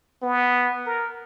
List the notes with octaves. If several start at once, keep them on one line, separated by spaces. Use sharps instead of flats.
B3
A#4